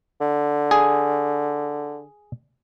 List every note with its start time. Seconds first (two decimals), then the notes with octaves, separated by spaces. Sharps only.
0.21 D3
0.71 G#4